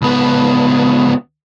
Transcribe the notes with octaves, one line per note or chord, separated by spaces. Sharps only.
C#2 B3